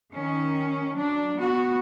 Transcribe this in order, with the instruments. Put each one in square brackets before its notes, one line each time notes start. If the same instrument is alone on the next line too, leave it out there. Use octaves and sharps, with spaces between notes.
[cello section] D#3 C#4
F#3 D4
B3 F#4